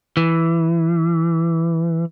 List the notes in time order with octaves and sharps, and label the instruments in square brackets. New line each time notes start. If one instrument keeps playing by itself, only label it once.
[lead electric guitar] E3